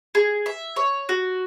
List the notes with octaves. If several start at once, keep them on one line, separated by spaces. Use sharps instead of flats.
G#4
E5
C#5
F#4